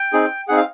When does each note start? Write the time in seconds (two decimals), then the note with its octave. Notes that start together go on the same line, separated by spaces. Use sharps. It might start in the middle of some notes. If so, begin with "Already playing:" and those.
Already playing: G5
0.13 C4 D#4 G#4
0.48 C4 D#4 G#4 F#5
0.57 F5